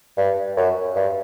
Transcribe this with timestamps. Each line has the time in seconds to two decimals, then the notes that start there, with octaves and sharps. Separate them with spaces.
0.17 G2
0.57 F#2
0.96 G2